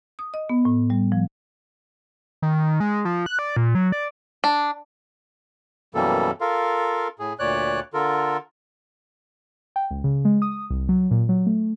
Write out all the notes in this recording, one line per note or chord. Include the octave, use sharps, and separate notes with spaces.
D#6
D#5
B3
A2
G3
F3
D#3
G#3
F3
F#6
D5
A#2
F#3
D5
D4
F#2 B2 E3 G3 A#3 A4
F4 A4 A#4 F5
A2 G#4
D2 A#2 C#5 D5 F#6
D3 F4 A4 A#4
G5
C#2
C#3
G#3
D#6
C2
F#3
A#2
F#3
A3